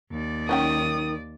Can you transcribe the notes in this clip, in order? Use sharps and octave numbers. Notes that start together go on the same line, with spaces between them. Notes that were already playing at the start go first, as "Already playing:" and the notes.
D#2 D5
D#3 F#3 C#4 G5 D#6